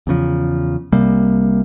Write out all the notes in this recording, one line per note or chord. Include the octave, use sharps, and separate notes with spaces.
E2 C#3 F3
C2 C3 G3 A#3